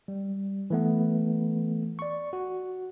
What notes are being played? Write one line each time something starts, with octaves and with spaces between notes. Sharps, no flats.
G3
E3 A3 B3
D5 C#6
F#4